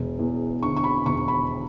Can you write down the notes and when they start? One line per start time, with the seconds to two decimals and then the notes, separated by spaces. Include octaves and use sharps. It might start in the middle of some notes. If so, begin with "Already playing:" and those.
Already playing: E1
0.19 E2
0.63 D3 C#6
0.77 C#6
0.84 B5
1.06 E1 C#6
1.28 B5